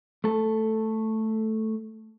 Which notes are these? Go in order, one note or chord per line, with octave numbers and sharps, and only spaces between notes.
A3 A4